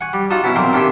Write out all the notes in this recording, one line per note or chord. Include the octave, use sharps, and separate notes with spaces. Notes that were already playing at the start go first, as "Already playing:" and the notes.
F#5 G#5 C#6
G3
D#4 F4 F#4 A5 D#6
B2 C#4 E4 E5 A#5
B1 A#3 C4 A#4 C5
D#3 D4 G4 E5 G#5 C6